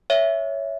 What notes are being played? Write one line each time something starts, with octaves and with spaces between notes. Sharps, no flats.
C#5 E5